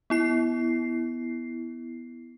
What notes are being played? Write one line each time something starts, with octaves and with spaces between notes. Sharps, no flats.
B3 E4 C7